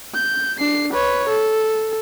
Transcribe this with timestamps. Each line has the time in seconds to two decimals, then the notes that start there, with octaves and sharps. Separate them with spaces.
0.14 G6
0.59 D4 C7
0.93 B4 C#5
1.29 A4